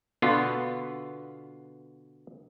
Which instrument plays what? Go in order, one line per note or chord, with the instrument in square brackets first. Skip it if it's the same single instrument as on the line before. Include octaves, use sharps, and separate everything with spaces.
[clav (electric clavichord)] B2 D3 B3 F4